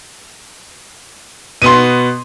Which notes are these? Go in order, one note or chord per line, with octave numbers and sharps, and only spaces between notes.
B2 B3 C6 D#7